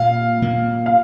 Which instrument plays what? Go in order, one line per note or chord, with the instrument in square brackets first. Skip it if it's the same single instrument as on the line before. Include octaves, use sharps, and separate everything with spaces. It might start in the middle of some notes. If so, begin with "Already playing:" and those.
Already playing: [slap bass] A#2 A#3 [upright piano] F5
[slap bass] A#2 A#3
[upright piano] F5